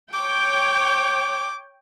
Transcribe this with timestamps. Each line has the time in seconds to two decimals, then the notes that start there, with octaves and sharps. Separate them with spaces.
0.13 C#5 G5 D6